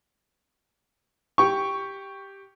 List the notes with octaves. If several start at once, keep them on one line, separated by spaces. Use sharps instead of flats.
G4 C#6